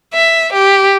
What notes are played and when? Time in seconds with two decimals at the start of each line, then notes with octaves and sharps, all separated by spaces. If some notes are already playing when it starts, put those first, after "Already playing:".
0.14 E5
0.53 G4